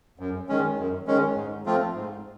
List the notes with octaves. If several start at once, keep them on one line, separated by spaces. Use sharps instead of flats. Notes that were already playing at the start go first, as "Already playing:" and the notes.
F#2
D#3 G#3 C#4
F#2
D#3 G#3 C#4
G#2
F3 A3 C4 F4
G#2